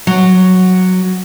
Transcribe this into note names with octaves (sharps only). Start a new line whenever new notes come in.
F#3